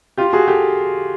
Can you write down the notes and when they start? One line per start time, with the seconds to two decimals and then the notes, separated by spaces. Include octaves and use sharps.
0.17 F4 G4
0.33 F#4 G#4
0.48 G4 A4